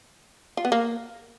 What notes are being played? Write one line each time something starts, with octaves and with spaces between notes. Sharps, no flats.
F4
B3
A#3